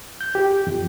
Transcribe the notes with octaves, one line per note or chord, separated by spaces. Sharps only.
G6
G4
F2